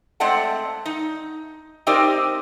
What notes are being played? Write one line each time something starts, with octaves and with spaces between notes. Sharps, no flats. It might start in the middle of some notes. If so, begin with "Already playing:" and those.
G#3 A3 C4 D5 F#5 A5
D#4
C4 D#4 G4 A#4 C5 D5